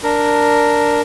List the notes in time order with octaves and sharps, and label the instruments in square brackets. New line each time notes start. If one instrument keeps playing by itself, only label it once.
[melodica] D4 A#4